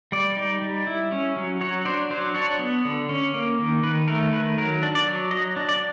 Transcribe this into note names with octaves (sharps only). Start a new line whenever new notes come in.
G3 D5
D#4
G3
E4
C#4
F#3
F#3 C#5
D4 C5
F#3 C5
D4 C#5
B3
D3
C#4
A#3
D#3
D#3 B4
A3 A#4
D#3 B4
F#3 A#4
D4
D5
F#3
F#3 D#5
D4
D5